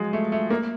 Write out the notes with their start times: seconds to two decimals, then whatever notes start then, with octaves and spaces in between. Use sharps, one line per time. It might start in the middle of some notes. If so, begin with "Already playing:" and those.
Already playing: F3 F#3 G#3
0.13 A3
0.32 A3
0.50 A#3